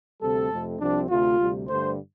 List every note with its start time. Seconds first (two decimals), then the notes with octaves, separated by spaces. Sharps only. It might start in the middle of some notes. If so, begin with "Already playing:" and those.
0.21 D2 C3 G3 C4 A4
0.51 F2 C3 A3 C4
0.80 C2 C3 F3 C4 D4
1.09 D2 C3 A3 F4
1.39 D2 C3 G3
1.69 G2 D3 A3 C5